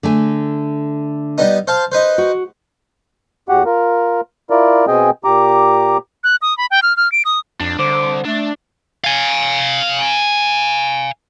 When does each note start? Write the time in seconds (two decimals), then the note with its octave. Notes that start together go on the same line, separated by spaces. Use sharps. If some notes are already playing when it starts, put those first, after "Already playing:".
0.03 D3 A3 G#5
1.38 G3 B3 D#4
1.67 C5 F5 A5
1.92 D#4 B4 C5
2.18 F#4
3.49 E2 F#4 G4 F#5
3.65 F4 A#4
4.50 E4 F4 A#4 D5
4.87 B2 C4 G#4 D#5 G5 G#5
5.24 A#2 G4 A#5 D6
6.24 F#6
6.42 D#6
6.58 B5
6.71 G5
6.82 F6
6.97 F6
7.12 D7
7.25 D#6
7.61 F2 D4
7.79 C2 D3 C5 D6
8.25 A3 D4
9.04 F5 G#5